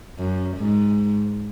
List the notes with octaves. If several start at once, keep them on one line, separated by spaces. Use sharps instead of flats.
F#2
G#2